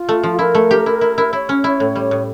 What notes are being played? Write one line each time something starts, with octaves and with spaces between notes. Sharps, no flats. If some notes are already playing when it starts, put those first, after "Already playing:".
Already playing: F4
A3
F3
E4 A#4
A3
G4
E4
E4
E4
E4 C#5
C#4
E4
A2
G3
A2